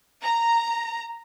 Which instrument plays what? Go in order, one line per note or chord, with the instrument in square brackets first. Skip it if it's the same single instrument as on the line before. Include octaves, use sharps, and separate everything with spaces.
[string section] A#5